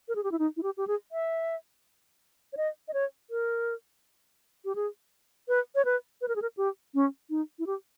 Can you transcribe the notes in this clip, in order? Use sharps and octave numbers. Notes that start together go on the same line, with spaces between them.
A#4
G#4
G4
E4
D#4
E4
G4
G4
G#4
E5
C#5
D#5
D#5
C#5
A#4
G4
G#4
B4
C#5
B4
B4
A#4
G#4
A#4
G4
C#4
D#4
E4
G4